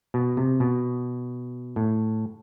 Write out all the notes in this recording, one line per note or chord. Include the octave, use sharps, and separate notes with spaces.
B2
C3
B2
A2